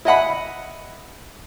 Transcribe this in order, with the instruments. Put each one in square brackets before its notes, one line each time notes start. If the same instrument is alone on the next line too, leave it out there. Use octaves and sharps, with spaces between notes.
[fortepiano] E4 D#5 F#5 B5